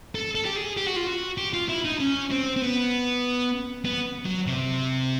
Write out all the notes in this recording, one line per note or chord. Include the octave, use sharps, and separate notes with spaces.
A4
A4
G4
G#4
G4
F#4
F4
F#4
G4
F4
E4
D#4
C#4
C4
C4
B3
B3
F#3
C3